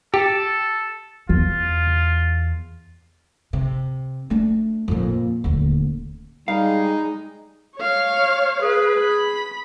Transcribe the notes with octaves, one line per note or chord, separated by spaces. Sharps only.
G4 A4
E2 F4
C3
A3 D4
F2 A#2
D#1 D2
G3 G#3 D#4 F5
C#5 F5
G#4 B4
B5